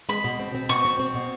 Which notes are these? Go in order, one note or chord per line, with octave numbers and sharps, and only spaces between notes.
G#3 B5
B2
C4
C4
B2 C#6
C4
C4
B2